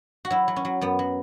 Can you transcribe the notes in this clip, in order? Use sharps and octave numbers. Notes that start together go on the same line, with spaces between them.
F#4
F#3 E4
F#3
C#4
F#3
F#2 B3
F#3